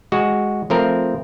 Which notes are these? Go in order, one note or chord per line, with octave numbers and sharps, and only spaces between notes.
G#3 F#4
F3 A3 C4 A#4